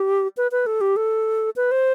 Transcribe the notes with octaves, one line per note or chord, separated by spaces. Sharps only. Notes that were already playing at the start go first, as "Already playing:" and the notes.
Already playing: G4
B4
B4
A4
G4
A4
B4
C5